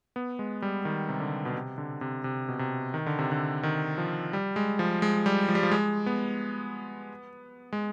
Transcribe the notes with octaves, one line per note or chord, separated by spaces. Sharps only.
B3
G#3
G3
D#3
C3
D3
B2
C3
D3
C3
C3
B2
C3
D#3
D3
C3
D3
D#3
F3
G3
G#3
F3
G#3
G3
F3
G3
F3
G#3
B3
G#3